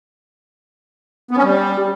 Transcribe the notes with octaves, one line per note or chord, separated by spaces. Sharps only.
B3
C#4
G3